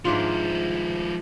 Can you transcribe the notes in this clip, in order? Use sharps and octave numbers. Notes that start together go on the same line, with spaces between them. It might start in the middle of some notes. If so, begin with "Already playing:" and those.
G#2 F3 D4 E4 F4